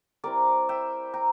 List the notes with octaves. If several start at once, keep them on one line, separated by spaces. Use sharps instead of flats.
G3 C4 E4 A#4 D5
E5 G5
G5 A#5